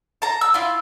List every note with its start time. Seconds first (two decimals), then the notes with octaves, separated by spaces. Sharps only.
0.22 A5 A#5
0.41 E6
0.54 E4 F4